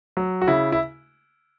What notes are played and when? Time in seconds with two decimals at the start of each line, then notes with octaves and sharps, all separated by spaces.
0.17 F#3
0.42 F#4
0.47 C#3 E4
0.72 E4